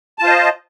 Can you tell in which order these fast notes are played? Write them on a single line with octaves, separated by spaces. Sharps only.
A5 F4 C5 D#5